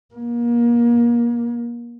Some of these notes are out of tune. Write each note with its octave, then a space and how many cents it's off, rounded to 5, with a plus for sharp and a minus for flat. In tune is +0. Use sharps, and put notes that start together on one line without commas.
A#3 +30